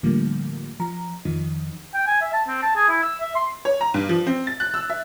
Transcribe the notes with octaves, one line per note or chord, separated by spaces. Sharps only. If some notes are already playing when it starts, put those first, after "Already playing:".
A2 D3 F3 G3 A3 A#3
F3 A#5
F2 D#3 F3 D#4
G5
G#5
E5
A5
C4
A5
G#4
E4
E6
E5
C6
C#5
A#5
G2
F3
C4
A6
F#6
E6
E5